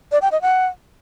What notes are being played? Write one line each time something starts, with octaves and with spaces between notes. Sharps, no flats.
D5
G5
D#5
F#5